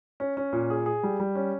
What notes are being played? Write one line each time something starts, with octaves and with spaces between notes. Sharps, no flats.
C#4
C#4
A#2
G#4
G#4
G3
G3
C#4